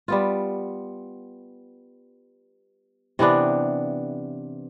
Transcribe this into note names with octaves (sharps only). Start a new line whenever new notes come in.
G3 B3 F4
C3 E3 B3 D4